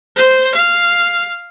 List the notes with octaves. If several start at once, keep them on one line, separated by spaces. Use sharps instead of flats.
C5
F5